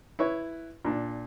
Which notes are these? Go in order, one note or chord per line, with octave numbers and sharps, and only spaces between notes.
E4 B4 C#5
A#2 D4